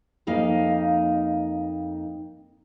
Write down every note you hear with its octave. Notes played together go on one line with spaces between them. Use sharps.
F2 A#3 D#4 F5